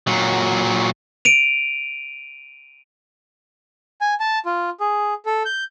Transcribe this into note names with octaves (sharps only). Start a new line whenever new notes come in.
A#2 F#3
D7 D#7 F7
G#5
A5
F4
G#4
A4
G6